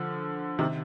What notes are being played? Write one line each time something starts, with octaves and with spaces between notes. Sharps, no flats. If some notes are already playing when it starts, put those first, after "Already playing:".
Already playing: D3 F3
C3 D#3